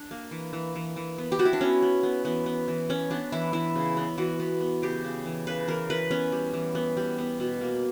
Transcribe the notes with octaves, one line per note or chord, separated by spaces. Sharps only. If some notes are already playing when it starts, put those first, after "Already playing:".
Already playing: D4
A#3
E3
E3
E3
E3
B3
G4
B3 F#4
E4
D4
B3 C#4
B3
B3
E3 B3
B3
E3
B3 C#4
B3 D4
E3 E4
E3 E4
C#3
B3
E3 F#4
B3
B3
C#3 G4
C#3
E3
C#3 B4
E3 A#4
E3 B4
B3 C#4
G3
E3
B3
G3
B3
B2
A#3